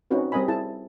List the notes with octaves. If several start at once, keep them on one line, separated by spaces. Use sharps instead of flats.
C4 C#4 D#4 F#4 B4
G3 C4 A#4 D#5 G#5 B5
E4 G#4 A5